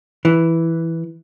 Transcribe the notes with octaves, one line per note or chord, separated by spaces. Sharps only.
E3